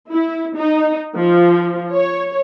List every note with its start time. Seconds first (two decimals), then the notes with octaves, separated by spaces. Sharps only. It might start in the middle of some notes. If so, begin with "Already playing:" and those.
0.11 E4
0.57 D#4
1.16 F3
1.93 C#5